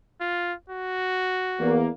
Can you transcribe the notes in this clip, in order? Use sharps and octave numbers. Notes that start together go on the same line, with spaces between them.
F4
F#4
E2 A#3